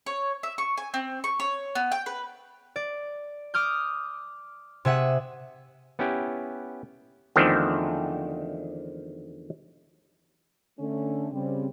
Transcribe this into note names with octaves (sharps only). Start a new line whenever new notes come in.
C#5
E5
C#6
G#5
C4
C#6
C#5
B3
G5
B4
D5
D6 D#6 F6 G6
C3 G#4 E5 F#5 D#7
B3 C#4 E4 G4 B4
E2 D3 D#3 F3 A3 C4
D3 A3 C#4
C#3 G3 C4